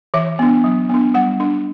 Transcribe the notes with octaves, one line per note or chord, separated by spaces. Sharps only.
E3 E5
B3 D4
F#3
B3 D4
G3 F#5
D4